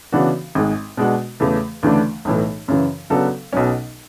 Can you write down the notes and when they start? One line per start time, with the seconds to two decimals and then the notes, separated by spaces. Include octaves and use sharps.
0.12 C#3 E3 B3 D4 F#4
0.55 G#1 G#2 G#3
0.97 B2 G#3 D4 F#4
1.40 E2 C#3 E3 A3
1.83 D2 C#3 E3 A3 D4
2.25 B1 A2 E3
2.68 F#2 C#3 E3
3.10 C#3 F#3 B3 D4 A4
3.53 B1 B2 F#3 C#4